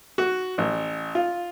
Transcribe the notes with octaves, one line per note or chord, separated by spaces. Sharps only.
F#4
A1
F4